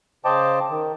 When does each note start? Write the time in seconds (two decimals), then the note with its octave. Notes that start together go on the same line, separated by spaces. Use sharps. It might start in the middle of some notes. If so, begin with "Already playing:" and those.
0.25 C#3 C5 D#5 G5 A5 D6
0.70 D#3